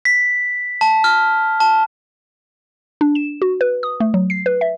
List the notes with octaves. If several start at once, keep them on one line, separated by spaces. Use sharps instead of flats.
B6
A5
F6
A5
D4
E7
F#4
B4
D#6
A3
F#3
C7
B4
E5